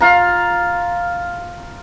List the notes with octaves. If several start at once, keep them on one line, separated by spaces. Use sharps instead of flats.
F4 F5 A#5